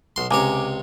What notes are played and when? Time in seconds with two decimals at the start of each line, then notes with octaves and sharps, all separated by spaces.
0.16 B1 C6
0.31 C#2 C3 C#5 G#5 A#5 D6